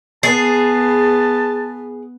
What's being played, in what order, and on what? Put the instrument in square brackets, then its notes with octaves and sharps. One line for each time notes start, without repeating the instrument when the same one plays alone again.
[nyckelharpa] B3 [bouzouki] G#4 [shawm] A5 [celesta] A6 C7